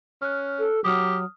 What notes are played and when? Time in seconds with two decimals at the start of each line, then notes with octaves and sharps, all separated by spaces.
0.22 C#4 F6 F#6
0.59 A4
0.84 F#3 G4 D#6 F6